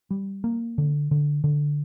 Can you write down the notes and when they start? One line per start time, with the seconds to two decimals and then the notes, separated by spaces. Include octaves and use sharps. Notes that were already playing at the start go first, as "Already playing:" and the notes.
0.11 G3
0.44 A#3
0.78 D3
1.11 D3
1.44 D3